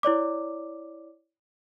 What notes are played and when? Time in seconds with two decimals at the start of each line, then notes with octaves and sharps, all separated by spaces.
0.03 E4 C#5 D5 D6